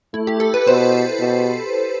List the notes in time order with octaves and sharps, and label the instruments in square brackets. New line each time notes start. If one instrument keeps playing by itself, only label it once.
[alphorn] A3 [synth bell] E4
[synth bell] G4
A4
B4
[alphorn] B2 [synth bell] C5
[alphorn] B2